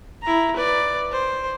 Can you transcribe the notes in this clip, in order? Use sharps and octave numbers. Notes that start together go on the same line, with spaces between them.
E4 A#5
B4 D5
C5